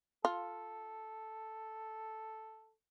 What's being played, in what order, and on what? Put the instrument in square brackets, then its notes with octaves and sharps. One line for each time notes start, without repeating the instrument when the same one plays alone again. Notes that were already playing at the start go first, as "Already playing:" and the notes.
[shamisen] F4 [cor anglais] A4